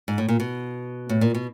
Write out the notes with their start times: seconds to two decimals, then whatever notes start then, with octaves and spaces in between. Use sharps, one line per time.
0.08 G#2
0.18 A2
0.28 A#2
0.40 B2
1.09 A2
1.21 A#2
1.35 B2